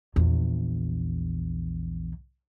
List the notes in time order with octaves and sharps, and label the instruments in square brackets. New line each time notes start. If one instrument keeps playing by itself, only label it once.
[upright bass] A#1 E2